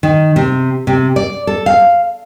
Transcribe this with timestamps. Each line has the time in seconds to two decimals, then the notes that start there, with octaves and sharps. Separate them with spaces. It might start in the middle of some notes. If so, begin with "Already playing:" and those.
0.03 D#3
0.36 C3
0.87 C3
1.16 D5
1.47 A4
1.66 F5